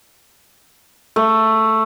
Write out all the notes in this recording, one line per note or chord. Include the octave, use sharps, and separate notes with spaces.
A3